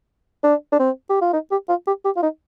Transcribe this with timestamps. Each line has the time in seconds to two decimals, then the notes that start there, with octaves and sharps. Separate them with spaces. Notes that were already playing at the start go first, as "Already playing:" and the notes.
0.43 D4
0.72 D4
0.79 C4
1.09 G4
1.21 F4
1.33 D#4
1.51 G4
1.69 F4
1.87 G4
2.05 G4
2.16 F4
2.22 D#4